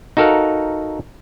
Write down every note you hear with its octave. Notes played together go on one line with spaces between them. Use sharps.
D#4 F#4 A4 A#4 F5 F#5